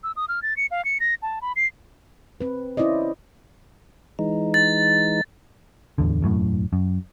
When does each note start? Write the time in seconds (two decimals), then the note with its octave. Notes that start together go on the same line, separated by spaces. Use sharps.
0.04 E6
0.16 D#6
0.29 F6
0.43 A6
0.57 C#7
0.71 F5
0.85 C#7
1.00 A#6
1.22 A5
1.42 B5
1.56 C7
2.41 C4 B4
2.77 C#4 E4 C5 D5 D#5
4.19 E3 G#3 D#4
4.54 A6
5.98 D1 A1 E2 D3
6.22 E1 F#2 A2
6.73 F#2